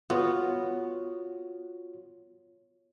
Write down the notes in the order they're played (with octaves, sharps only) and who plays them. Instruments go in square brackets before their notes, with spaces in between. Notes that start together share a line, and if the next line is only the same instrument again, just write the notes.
[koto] B3 [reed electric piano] F4 F#4 C#5